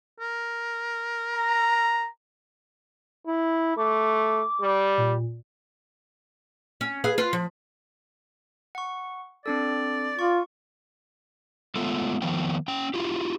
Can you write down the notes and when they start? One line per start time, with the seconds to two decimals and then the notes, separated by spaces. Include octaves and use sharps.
0.20 A#4
1.34 A#5
3.27 E4
3.77 A3 D6
4.62 G3
4.98 A#2
6.81 C#4
7.04 G#4 B4 F5
7.18 F4 B4
7.33 F3
8.75 F#5 C#6
9.46 C4 D4 A4 D5
10.19 F4 C#6
11.76 G#3 A3 B3 F4 A4
12.22 D#3 F3 B3 G5
12.68 C#4 G5
12.94 E4 F4 G4